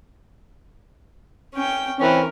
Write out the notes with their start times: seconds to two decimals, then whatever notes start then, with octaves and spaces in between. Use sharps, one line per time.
1.54 C#4 G5
2.00 E3 C4 C#4 A#4